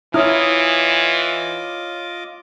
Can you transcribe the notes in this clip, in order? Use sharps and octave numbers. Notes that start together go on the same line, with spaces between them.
E3 E4 F4 C#5 D#5 D6 D#6 F6